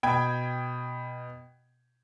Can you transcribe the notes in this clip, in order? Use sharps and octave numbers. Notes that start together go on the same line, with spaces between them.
B2 G5 B5 G#6